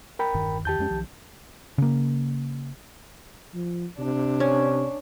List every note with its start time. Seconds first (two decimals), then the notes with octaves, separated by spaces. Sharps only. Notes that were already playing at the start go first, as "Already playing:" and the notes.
0.19 A#4 G5 B5
0.34 E1 G2 D#3
0.65 E2 D#3 G4 A5 G6
0.79 F2 G#3 C#4
0.90 B1 D#3 F3
1.78 C#3 A#3
3.55 F3
3.99 C3 D4
4.40 C#4